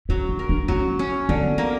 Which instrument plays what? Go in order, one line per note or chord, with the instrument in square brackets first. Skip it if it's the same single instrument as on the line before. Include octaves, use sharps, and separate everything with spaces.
[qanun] F#3 [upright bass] C#4
[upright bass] D4
[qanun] A#4
[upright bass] D4
[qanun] F#3 [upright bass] C#4
[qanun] C#4
[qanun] D3 [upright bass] B3
[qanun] A#3